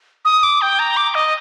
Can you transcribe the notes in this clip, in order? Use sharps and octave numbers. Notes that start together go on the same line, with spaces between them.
D#6
D6
G5
A#5
D6
D#5